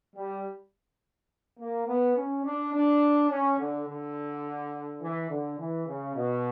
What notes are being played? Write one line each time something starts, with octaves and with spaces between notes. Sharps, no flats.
G3
A#3
B3
C#4
D4
D4
C#4
D3
D3
E3
D3
E3
C#3
B2